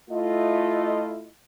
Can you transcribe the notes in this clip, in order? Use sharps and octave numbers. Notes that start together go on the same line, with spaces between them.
A3 E4 F4 D#5